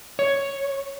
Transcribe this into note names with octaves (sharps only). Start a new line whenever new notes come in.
C#5